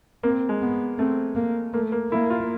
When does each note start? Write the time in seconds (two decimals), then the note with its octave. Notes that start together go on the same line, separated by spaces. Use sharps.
0.23 A#3 C4
0.49 G#3
0.61 B3
0.99 A3 C4
1.36 A#3
1.74 A3 A#3
1.92 A#3
2.11 A#3 E4
2.30 F4